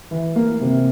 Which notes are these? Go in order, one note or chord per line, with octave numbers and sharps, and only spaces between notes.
E3
A#3
C3